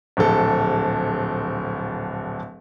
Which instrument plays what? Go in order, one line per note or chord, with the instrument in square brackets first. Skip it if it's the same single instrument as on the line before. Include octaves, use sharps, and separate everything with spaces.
[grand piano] D1 A#1 A4